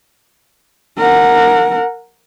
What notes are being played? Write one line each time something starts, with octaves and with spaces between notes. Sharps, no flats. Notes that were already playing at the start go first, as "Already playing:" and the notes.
A#4 F#5